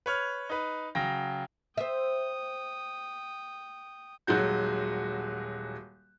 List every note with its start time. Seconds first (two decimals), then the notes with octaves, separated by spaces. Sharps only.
0.06 B4 C#5 F6
0.50 D#4 B4
0.95 C#3 F#3 G5 A#6
1.78 C5 E5 G5 D#6
4.27 D#1 F#3 G#3 F#4 G6